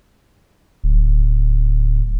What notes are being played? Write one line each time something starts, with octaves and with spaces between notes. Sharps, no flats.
D1